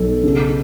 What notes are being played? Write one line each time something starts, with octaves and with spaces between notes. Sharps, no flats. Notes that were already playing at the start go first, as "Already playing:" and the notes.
Already playing: B1 A4
C#3